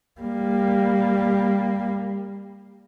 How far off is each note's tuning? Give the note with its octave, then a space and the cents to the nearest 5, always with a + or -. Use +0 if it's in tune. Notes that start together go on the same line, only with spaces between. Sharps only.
G3 +15 A#3 +0